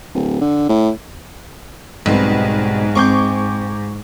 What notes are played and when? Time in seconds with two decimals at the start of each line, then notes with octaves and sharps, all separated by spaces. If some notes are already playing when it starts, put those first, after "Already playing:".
0.14 D1
0.41 D3
0.69 A2
2.06 B1 G#2 B2 G3 C4
2.95 G#3 C4 G#4 C#6 D6 G6